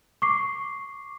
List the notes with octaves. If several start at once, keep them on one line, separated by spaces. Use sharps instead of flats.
C#6 D6 C7